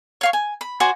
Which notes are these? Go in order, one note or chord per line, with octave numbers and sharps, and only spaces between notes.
C#5 F5 C#6
G#5
B5
F#4 C5 D5 G#5